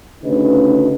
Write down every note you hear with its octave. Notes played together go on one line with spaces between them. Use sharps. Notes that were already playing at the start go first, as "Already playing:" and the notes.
D2 C#3 D#4 B4